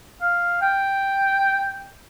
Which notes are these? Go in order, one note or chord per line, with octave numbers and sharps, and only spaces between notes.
F5
G5